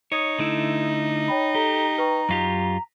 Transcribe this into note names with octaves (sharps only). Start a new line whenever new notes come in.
D#4 C#5 D#6 G#6 D#7
D3 A3 E4
C#5 G5 B5
G4 A4 A#5
B4 G5 C#6
F#2 F4 G4 A#6 B6 F7